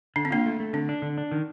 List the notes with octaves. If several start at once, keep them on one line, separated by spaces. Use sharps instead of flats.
D3 D4
C4
A#3 D4 F4
A3
A3
D3 C4
D4
D3
D4
D#3